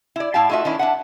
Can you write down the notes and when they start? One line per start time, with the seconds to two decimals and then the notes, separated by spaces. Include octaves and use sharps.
0.16 E4 D5
0.34 A2 E4 F5 G5 A5
0.49 A3 D#4 F4 F#4 E5
0.65 D#3 C#4 D4 E4
0.79 D4 E5 F#5